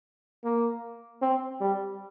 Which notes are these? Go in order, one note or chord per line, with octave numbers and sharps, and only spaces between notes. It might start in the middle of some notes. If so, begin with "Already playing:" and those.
A#3
C4
G3